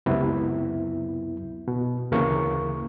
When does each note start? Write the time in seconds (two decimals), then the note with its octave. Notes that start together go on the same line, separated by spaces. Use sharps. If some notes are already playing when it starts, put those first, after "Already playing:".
0.06 C#2 F#2 C3 F#3 B3 E4
1.68 B2
2.12 D2 C#3 E3 A#3 C#6